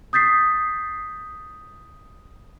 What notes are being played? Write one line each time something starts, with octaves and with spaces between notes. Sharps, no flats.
D#6 G6 A6 B6 C7